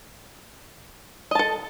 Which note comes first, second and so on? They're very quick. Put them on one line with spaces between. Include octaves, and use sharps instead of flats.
D#5 A5 A4